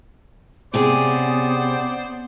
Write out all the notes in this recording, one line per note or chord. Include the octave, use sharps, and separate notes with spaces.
C3 B3 C#4 G#4 C5 D5